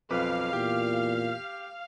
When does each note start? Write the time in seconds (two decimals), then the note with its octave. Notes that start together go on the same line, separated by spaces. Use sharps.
0.11 B1 F2 B4 F5 D6
0.53 E2 A#2 G4